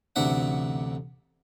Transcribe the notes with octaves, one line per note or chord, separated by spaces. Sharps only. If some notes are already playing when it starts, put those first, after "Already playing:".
A1 D2 C3 D4 E5 F#5